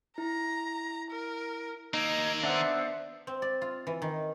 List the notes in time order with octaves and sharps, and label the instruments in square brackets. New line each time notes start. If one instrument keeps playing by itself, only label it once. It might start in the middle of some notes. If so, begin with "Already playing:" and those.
[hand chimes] E4 [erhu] A#5
[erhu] A#4
[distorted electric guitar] D#2 A#3 [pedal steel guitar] D#4 [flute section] E6 G#6
[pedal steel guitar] B3 D4 [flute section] C5 D5 F#5 [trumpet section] E5
[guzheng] C4
D5
F4
E3
D#3